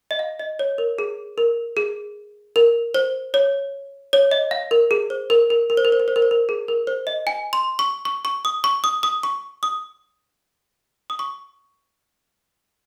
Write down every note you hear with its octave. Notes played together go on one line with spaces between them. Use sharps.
D#5
F5
D#5
C#5
A#4
G#4
A#4
G#4
A#4
C5
C#5
C#5
D#5
F5
A#4
G#4
C5
A#4
A#4
A#4
C5
A#4
C5
A#4
C5
A#4
C5
A#4
G#4
A#4
C5
D#5
G#5
C6
C#6
C#6
C#6
D#6
C#6
D#6
D#6
C#6
D#6
D#6
C#6